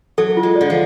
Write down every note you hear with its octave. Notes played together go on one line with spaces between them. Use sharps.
F#3 A4
F4
G#3
D3 D5
F3